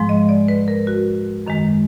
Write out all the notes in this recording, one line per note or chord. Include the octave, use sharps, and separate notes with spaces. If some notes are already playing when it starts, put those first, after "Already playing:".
Already playing: G#2 F3 G#3
D#5
D5
B4
A#4
F#4
F#2 D#3 G#3